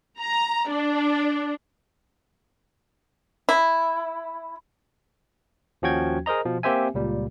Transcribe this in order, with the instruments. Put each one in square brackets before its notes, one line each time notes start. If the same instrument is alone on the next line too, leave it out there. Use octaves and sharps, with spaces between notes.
[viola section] A#5
D4
[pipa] E4
[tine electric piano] D#2 F3 C#4 F#4 G5 G#6
G#4 A#4 C5 D#5 A#5
B2 F3
A#3 C4 G4 C5 E5 G#5
C#2 A#2 G3